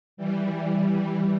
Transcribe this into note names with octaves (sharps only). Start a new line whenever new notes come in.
E3 G3